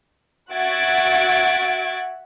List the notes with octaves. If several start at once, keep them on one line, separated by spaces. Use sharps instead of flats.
F#4 E5 F#5 G#6 A6 D7